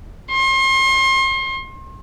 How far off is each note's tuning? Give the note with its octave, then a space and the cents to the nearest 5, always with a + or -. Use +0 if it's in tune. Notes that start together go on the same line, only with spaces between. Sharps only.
C6 +35